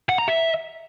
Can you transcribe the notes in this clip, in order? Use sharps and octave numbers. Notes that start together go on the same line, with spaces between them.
F#5
A#5
E5